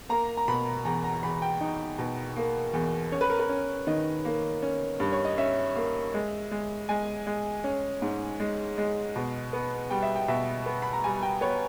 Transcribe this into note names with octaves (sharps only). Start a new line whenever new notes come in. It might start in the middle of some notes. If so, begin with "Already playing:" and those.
A#3 A#5
A#5
B2 B5
E2 A#5
A#5
E2 B5
G5
D#4
B2
A#3
E2
C#4 C#5
B4
A#4
B4
C#4
D#3 D#5
A#3
C#4
G2
C#5
D#5
C#4 E5
A#3
G#3
G#3
G#3 G#5
G#3
C#4
G#2
G#3
G#3
B2
B3
G3 G5
E5
G5
B2 E5
B3
B5
A#5
G3 G#5
G5
B3 C#5